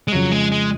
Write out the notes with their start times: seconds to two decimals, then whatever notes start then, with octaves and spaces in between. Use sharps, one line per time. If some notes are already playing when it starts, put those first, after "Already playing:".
0.08 G#3
0.12 F2 C#3 F3 F#3
0.32 G#3
0.52 G#3